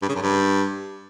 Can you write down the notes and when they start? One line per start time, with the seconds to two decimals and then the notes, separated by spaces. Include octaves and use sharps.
0.02 G2
0.09 C#3
0.15 F#2
0.22 G2